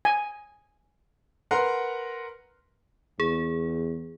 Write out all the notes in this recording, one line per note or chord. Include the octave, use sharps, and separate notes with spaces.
G#5
A#4 B4 F#5 A#5 C6
E2 G#4